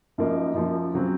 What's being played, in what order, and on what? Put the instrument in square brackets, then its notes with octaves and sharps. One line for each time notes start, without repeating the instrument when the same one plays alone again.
[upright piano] F#2 F3 A#3 D#4
F#2 F3 A#3
C#3 F#3 C4